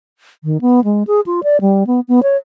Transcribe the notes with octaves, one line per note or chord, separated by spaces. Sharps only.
D#3
B3
G#3
G#4
F4
D5
G3
B3
B3
C#5